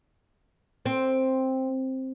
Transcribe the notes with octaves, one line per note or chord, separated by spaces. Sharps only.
C4